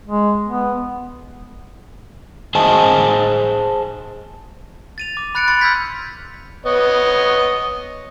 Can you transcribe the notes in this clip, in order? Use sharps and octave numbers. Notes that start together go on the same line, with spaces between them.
G#3
B3
G#4 C5 D#5 G#5 A5
A6 D#7 F7
D6
B5 F#6 A6 C#7 D7
B5 C6 A6 C#7
C6 E6 F6 G6 G#6 B6
B3 C#5 D#5